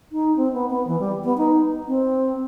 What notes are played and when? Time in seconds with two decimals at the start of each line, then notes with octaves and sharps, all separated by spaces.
0.12 D#4
0.37 C4
0.53 B3
0.70 B3
0.87 E3
1.00 G3
1.24 B3
1.38 D#4
1.88 C4